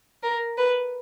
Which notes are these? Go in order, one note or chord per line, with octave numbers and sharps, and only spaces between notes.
A#4
B4